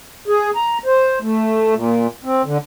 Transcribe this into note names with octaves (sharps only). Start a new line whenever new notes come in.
G#4
A#5
C5
A3
A#2
C4
D3